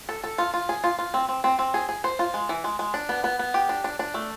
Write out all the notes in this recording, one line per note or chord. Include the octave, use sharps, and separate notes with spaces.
A4
A4
F4
F4
G#4
F4
F4
C4
C4
C4
C4
G#4
G#4
C5
F4
G#3
E3
G#3
G#3
D4
B3
B3
B3
G4
D4
D4
D4
A3